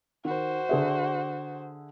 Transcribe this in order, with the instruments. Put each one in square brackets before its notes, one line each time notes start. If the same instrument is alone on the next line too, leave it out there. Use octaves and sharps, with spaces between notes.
[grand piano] D#3 [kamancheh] F#4 C5
[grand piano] D3 G#4 E5